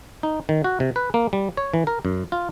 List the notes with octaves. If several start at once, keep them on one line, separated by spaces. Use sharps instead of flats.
D#4
D#3
F#4
C3
B4
A#3
G3
C#5
E3
A#4
F#2
F4